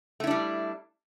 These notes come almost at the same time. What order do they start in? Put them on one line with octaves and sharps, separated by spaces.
A3 E4 D4 G3